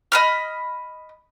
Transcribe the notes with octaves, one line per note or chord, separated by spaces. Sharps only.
D#5 B5 F6